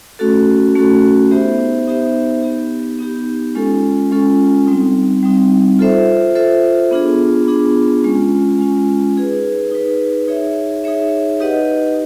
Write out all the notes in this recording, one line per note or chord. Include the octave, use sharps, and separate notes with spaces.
A3 C#4 F#4 A4
A3 C#4 F#4 A4
B3 D#4 G4 C5 E5
B3 D#4 G4 C5 E5
B3 D#4 G4
B3 D#4 G4
G#3 C#4 F4 A4
G#3 C#4 F4 A4
G3 C4 D#4
G3 C4 D#4
F4 A4 C5 E5
F4 A4 C5 E5
B3 D4 F4 G#4
B3 D4 F4 G#4
G#3 C#4 F4
G#3 C#4 F4
D#4 G#4 B4
D#4 G#4 B4
D#4 G#4 C#5 E5
D#4 G#4 C#5 E5
D#4 G4 B4 D#5 F#5